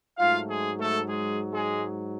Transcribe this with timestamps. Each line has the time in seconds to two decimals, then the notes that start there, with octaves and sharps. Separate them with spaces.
0.18 G#2 F#3 A3 F4 F5
0.49 G#3 G#4
0.79 A3 A4
1.08 G#3 G#4
1.53 G#3 G#4